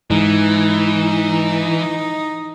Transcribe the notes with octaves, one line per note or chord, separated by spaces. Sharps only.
G#2 E3 D#4